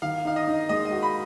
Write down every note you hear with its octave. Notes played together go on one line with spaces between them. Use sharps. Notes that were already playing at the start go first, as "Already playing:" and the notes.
D#3 F5
D#4 F5
D#5
D#4
G#3 D#5
D#5
F#4
B5